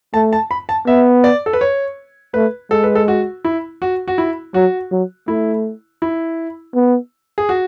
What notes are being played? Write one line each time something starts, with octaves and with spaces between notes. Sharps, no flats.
A3 A5
A5
B5
A5
B3 E5
D5
A4
B4
C#5
A3 B4
G#3 A4
B4
A4
F#4
E4
F#4
F#4
E4
F#3 F#4
F#3
A3 E4
E4
B3
G#4
F#4